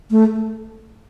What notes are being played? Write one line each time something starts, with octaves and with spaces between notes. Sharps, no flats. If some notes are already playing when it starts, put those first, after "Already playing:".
A3